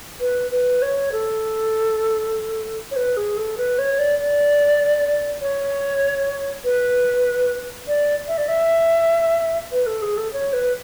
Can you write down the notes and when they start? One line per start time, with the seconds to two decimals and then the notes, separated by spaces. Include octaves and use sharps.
0.20 B4
0.51 B4
0.82 C#5
1.12 A4
2.91 C#5
2.96 B4
3.17 G#4
3.37 A4
3.58 B4
3.78 C#5
3.99 D5
4.19 D5
5.42 C#5
6.65 B4
7.87 D5
8.28 E5
8.38 D5
8.48 E5
9.72 B4
9.87 A4
10.02 G#4
10.17 A4
10.33 C#5
10.53 B4